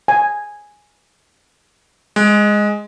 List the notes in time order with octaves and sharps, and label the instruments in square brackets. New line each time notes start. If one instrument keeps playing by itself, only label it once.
[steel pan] G#5
[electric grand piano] G#3